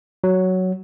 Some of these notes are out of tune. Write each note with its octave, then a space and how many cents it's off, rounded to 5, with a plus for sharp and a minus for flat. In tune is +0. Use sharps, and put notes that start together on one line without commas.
F#3 +5